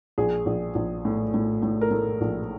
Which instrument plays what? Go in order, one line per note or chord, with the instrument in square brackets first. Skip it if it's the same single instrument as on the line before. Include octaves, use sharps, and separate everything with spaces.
[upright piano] A#1 G#4
A#1
A#1
A2
A2
A2
A#4
A2 A4
A#1